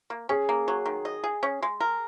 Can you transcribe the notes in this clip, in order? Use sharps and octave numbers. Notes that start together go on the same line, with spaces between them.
A#3
C#4 G#4
A#3
F#3
D#3
D#5
G#4
C#4
G#3
A#4